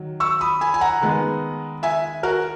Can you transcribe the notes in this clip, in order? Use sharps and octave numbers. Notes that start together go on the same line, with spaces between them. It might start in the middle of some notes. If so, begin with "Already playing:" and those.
Already playing: D#3 F#3
C#6 E6
B5 D#6
G#5 B5
G#5
F#5 A#5
D#3 G#3 B3
E5 G#5
F#4 A#4